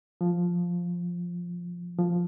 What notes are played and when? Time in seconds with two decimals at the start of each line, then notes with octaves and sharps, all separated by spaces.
0.21 F3
1.99 F3